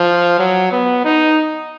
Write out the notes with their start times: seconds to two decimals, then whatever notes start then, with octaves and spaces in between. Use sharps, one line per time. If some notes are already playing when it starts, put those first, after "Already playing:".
Already playing: F3
0.39 F#3
0.72 B3
1.05 D#4